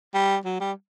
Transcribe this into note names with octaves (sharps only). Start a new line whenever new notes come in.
G3
F#3
G3